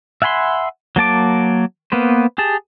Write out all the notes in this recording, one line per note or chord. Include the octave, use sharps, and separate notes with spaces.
E5 F#5 G#5 B5 C6
F#3 A#3 A5 D6
A#3 B3 B4 C5
G4 G#4 A5